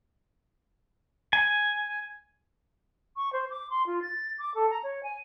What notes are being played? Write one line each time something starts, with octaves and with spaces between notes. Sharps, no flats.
G#5
C#6
C5
D6
C6
F4
A6
D6
A4
A#5
C#5
G#5